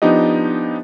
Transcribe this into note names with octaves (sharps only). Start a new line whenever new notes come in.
F3 B3 D4 D#4 G4 D#5